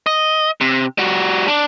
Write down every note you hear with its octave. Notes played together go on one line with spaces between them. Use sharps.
D#5
C3
G3 F#4
D4